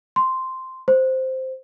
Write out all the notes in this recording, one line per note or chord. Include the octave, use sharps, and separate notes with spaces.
C6
C5